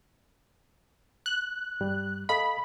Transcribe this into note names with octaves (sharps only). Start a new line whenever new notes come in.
F#6
G2 G3
A4 D#5 F5 B5